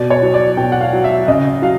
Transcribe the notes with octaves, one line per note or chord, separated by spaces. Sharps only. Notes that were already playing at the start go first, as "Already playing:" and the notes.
Already playing: B2 D5
C#5
F#3
D5
B2 G5
F#5
F5
F#3
E5
C#3 D#5
F#3 F5